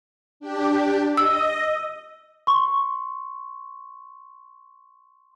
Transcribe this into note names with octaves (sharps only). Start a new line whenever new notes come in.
D4 G4
D#5 E6
C6 C#6